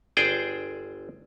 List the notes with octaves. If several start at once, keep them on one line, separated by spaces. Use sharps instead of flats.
G1 G#4 C5 D5 G5 G#5